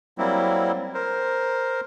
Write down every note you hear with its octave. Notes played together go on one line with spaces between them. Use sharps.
F#3 G3 A#3 C4 E4
A#4 C5